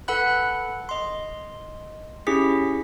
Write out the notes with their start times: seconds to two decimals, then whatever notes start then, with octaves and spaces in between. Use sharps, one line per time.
0.08 A4 B4 F#5 B5 F#6
0.89 D#5 C6
2.27 C#4 E4 G4 G#4 B6